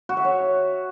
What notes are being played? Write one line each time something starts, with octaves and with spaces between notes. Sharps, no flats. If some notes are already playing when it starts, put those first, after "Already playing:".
F#4
E5
C#5